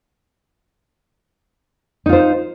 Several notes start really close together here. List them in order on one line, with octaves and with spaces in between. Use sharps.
D#4 F4 C5